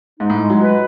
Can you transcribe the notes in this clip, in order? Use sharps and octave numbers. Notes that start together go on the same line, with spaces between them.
G#2 D#4
A2
G#3
F#3
F#3 B4